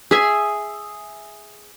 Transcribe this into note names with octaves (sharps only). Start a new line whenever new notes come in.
G#4 E5 G#5